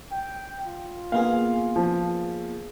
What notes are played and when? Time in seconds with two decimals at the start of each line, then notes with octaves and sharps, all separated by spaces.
0.12 G5
0.66 F4
1.12 A#3 B3 G#4 F5 G#5
1.76 F3